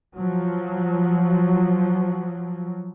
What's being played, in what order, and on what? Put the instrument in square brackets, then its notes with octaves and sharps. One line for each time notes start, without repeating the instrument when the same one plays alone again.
[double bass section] F3 F#3